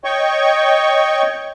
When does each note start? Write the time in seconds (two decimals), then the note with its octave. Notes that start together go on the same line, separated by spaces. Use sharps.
0.04 C#5 D#5 G5 C#6